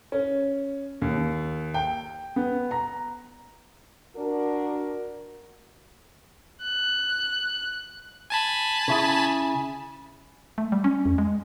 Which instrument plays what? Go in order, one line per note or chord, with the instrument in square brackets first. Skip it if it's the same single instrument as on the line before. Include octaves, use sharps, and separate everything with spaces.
[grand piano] C#4
D#2
G5
B3
A#5
[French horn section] D4 F#4 A#4
[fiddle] F#6
[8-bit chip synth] G#5 A5 B5
[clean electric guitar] C#3 E4 G#4
[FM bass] A3
G3
C#4
F2
G#3